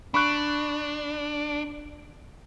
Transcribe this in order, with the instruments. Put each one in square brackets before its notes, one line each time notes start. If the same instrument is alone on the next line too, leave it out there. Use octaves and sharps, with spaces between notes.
[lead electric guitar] D4 [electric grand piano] B5 C#6 F#6